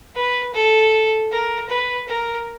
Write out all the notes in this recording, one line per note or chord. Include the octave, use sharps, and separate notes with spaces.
B4
A4
A#4
B4
A#4